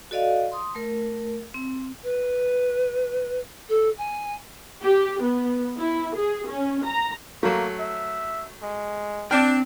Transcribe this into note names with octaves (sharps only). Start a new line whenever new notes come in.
F#4 A4 D5 D#5 F5
C6 D#6
A3 A#4
C4
B4
A4
G#5
G4
B3
E4
G#4
C#4
A#5
F#3 A3 A#3
E5
G#3
C4 D4 G5 F6